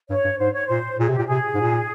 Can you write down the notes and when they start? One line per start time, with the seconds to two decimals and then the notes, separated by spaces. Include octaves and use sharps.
0.09 G2 C#5
0.24 G2
0.39 G#2 C5
0.53 C#5
0.67 A#2 C5
1.00 A#2 G#4
1.09 C3 G4
1.19 A#2
1.27 C3 G#4
1.55 G#2
1.60 A#2